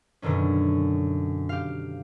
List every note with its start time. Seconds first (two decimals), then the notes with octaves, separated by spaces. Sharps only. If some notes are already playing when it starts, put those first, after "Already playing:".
0.22 F#2 B2 D3 D#3 C#4
1.49 G4 F5